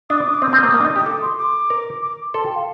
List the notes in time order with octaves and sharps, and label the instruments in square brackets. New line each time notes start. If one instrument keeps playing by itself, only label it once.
[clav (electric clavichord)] D4 [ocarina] D#6
[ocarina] D6
D#6
D6
[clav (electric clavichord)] C4 [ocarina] D#6
[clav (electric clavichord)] C4
A#3
A#3
D4
D#4
[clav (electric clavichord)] G4 [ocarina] D#6
[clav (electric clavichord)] A4 [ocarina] D6
[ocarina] C6
D6
[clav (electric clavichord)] A#4
[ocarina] D6
[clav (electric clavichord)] A4 [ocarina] C6
[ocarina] G5
F5